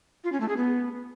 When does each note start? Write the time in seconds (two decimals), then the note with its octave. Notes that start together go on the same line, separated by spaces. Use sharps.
0.24 F4
0.32 C#4
0.40 A3
0.49 G#4
0.57 B3